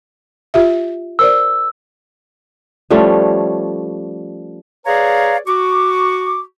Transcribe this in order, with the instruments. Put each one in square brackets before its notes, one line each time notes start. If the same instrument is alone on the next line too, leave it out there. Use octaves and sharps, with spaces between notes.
[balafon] F4 G4 E5
[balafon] A#4 C5 D5 [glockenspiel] E6
[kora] F3 G3 A3 C#4
[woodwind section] G#4 B4 C#5 D5 F5 A#5
F#4 C#6 D6